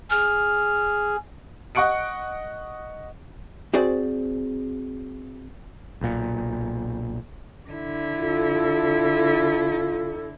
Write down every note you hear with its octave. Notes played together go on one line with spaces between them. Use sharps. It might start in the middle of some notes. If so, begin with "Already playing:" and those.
G#4 F6
D#5 F#5 C#6 F#6 C#7 D7
C4 F#4 G#4 C5 D5
B1 A#2
D3 E4
F4 A4